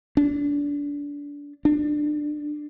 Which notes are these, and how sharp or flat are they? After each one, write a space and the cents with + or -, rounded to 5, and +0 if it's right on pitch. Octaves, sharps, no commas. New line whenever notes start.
D4 -25
D4 +20